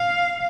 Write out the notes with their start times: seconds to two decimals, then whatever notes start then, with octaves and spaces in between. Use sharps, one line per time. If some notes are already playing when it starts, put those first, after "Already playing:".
Already playing: F5